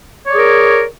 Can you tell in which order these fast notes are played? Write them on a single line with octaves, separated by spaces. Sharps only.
C#5 D5 G#4 A#4